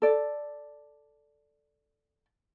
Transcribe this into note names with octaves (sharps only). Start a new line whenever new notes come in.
A4 D5